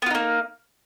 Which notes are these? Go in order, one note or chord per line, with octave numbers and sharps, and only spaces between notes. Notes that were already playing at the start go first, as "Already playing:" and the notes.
A#3 B3 D#4 F4